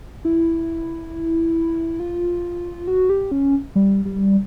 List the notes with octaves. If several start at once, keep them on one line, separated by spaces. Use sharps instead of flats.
E4
F4
F#4
G4
C#4
G3
G3